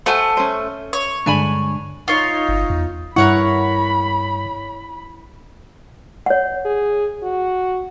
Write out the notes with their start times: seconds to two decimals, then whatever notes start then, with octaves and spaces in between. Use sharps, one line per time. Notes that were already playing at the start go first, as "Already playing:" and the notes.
0.06 A3 C5 F#5 G#5
0.37 C#4 C5
0.93 C#5
1.26 G2 D3 G#3 D4 G#5 B5
2.08 D#4 F4 C#5
2.49 G1
2.70 E2
3.16 G2 E4 A#4 C#5 F#5 B5 C#6
6.26 C#5 F#5
6.65 G#4
7.23 F#4